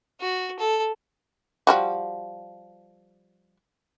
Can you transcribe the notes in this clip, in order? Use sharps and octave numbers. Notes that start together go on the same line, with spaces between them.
F#4
A4
F3 G3 F#4